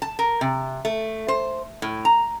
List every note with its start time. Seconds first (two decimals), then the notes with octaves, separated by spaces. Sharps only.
0.02 A5
0.19 A#4
0.41 C3
0.85 A3
1.28 C5
1.82 A2
2.05 A#5